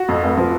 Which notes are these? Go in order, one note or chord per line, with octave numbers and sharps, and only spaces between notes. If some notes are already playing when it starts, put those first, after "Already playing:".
Already playing: F#4
F2
F1
F3